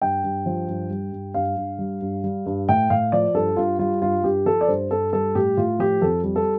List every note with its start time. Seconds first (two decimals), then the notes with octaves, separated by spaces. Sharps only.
0.02 G2 G5
0.24 G2
0.46 F3
0.69 G2
0.90 G3
1.12 G2
1.34 G2 F5
1.57 G2
1.79 G3
2.02 G2
2.24 G3
2.46 G2
2.69 A2 G5
2.90 A2 F5
3.12 F3 D5
3.34 G2 A4
3.56 G2 F4
3.79 G3 F4
4.01 G2 F4
4.23 G2 G4
4.45 F3 A4
4.61 D5
4.68 G2 C5
4.91 G2 A4
5.13 G3 A4
5.35 A2 G4
5.57 A2 F4
5.79 F3 G4
6.02 F2 A4
6.24 G3
6.36 A4